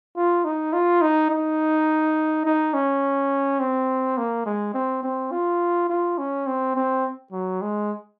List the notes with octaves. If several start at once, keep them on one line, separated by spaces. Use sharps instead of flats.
F4
D#4
F4
D#4
D#4
D#4
C#4
C4
A#3
G#3
C4
C4
F4
F4
C#4
C4
C4
F#3
G#3